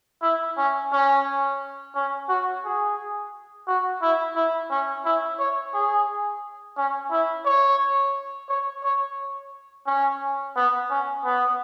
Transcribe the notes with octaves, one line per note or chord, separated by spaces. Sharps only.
E4
C#4
C#4
C#4
F#4
G#4
F#4
E4
E4
C#4
E4
C#5
G#4
C#4
E4
C#5
C#5
C#5
C#4
B3
C#4
B3